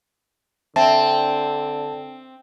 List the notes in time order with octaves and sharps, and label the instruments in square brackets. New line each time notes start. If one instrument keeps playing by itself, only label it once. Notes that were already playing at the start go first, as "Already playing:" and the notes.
[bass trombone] D3 [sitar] C4 [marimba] E5 [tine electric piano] A5